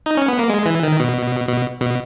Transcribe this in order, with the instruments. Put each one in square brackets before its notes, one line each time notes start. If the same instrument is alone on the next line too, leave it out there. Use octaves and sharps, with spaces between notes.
[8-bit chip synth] D#4
C#4
B3
A#3
G#3
E3
D#3
B2
B2
B2